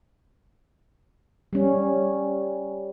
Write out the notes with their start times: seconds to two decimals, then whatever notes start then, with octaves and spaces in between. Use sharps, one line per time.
1.53 G3 C#4